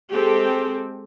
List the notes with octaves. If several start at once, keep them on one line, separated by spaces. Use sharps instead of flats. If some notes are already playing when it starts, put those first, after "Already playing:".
G#3 C4 G4 A4